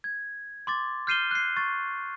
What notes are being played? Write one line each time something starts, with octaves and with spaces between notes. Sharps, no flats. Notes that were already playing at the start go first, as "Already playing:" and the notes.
G#6
C6 D6 A6
F6 G6 C7 D#7 E7 G7
F#6 C7
C#6 A6